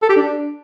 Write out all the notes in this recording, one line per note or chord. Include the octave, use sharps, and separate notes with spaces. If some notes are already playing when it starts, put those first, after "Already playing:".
A4
G4
D4